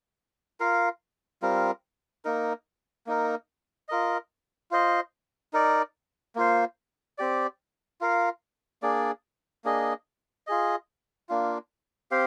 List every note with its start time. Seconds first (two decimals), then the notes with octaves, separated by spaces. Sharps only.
0.60 F4 A#4 F5
1.42 G3 C4 F4 A#4
2.25 A#3 D#4 A#4
3.07 A#3 D#4 A#4
3.89 F4 A#4 D#5
4.71 F4 C5 D#5
5.53 D#4 A#4 D5
6.36 A#3 F4 C5
7.18 C4 G4 D5
8.01 F4 A#4 F5
8.83 A#3 D4 G#4 D5
9.65 A#3 D4 G#4 D#5
10.47 F4 G#4 D#5
11.29 A#3 D4 F4
12.11 C4 G4 C5 F5